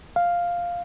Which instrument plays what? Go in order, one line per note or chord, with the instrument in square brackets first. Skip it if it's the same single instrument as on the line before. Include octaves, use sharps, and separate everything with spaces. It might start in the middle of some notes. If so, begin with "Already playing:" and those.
[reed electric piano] F5